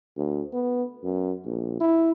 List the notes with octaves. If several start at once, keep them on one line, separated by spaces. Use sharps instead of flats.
D2
B3
F#2
A#1
E4